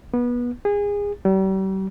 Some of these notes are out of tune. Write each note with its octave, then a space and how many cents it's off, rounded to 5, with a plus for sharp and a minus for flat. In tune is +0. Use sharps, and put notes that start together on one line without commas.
B3 -25
G#4 -25
G3 -40